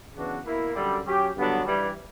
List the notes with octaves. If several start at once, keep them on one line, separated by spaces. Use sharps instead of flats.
C#3 E3 B3 D4 F#4
B2 A#3 E4
F#2 D3 G3
F#3 C#4 G4
G2 D3 F#3 B3 D4
G2 E3 G3